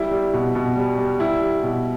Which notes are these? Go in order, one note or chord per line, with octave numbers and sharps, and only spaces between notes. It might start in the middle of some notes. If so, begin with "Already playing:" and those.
Already playing: G3 E4
G3
B2
B2
G3
G3
G3 E4
G3
B2